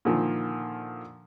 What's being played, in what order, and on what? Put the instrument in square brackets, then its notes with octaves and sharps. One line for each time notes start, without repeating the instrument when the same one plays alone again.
[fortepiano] A#2 D3 D#3 F3